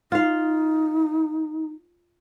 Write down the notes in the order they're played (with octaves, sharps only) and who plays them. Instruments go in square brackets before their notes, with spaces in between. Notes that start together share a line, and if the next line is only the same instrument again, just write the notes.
[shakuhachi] D#4 [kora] F4 F5